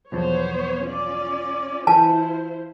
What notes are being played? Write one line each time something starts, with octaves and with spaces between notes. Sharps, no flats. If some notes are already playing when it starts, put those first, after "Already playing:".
B1 E2 F3 B3 C5 C#5
C#4 F4 D5
E3 E4 F4 C5 A5